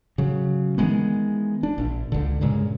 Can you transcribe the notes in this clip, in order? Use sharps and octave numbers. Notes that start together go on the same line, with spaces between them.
C#3 F#3
D#3 E3 G#3 B3
D4
A#1
C#2 D3
G2 A#2 C#3 G#3